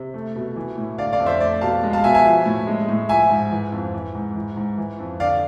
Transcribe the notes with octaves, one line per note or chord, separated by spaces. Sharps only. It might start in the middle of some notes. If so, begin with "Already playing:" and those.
Already playing: C3
A3
B2
E3
A2
D3 D5 F5
D5 F5
F2
C5 E5
A3 D5
B2 F5 A5
G#3
F5 A5
B2 E5 G#5
E5 G#5
F3
A2
G#3
A2
F3 E5 G#5
G#2
E3
F2
E3
G#2
E3
G#2
E3
F2
D3 D5 F5